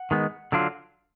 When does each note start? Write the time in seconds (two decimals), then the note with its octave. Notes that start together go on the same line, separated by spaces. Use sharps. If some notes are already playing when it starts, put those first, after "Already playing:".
Already playing: F#5
0.11 D#3 G#3 B3
0.52 D3 F#3 D4 F4